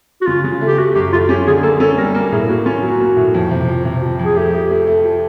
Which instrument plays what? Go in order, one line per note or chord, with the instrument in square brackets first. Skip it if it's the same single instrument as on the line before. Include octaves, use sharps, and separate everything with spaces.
[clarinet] F#4
[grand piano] C#3 [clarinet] F4
[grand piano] C#3
A3
[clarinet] G4
[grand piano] A3 [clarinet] F#4
[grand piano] F#2 [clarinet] G4
[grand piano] A3 [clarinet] F4
[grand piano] C#4 [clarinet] G4
[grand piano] D3 [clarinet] G#4
[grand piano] A#3 [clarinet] A4
[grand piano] C#4 [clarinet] A4
[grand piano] G3 [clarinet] A#4
[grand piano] A#3 [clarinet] A#4
[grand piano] A2 [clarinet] G#4
[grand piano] A#3 [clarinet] F#4
[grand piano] C#4 [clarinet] F4
[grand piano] F#3 [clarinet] F#4
[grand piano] A#3
A2
F2
C3
F3
C3
F3
F2
[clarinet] G#4
[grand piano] A3 [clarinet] G4
[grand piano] A3
A3
A3
F3